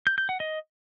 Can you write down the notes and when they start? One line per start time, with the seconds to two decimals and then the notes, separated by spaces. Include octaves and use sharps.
0.07 G6
0.18 G6
0.29 F#5
0.40 D#5